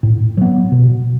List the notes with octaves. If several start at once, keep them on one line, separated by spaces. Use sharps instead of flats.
A2
F#3 B3
B2